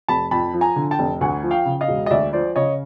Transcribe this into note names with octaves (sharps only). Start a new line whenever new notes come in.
F1 A5 B5
F2 A5 B5
F3
G#5 A#5
D3
G5 A5
F1
D2 F#5 G#5
F3
F5 G5
C#3
D#5 F5
E1
D#5
D2 D5 E5
F3 C5 D5
C#3 C#5 D#5